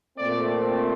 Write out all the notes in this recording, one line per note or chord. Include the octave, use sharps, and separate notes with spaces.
A#2 A3 C4 D5